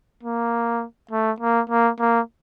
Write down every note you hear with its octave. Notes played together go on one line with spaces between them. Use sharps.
A#3
A3
A#3
A#3
A#3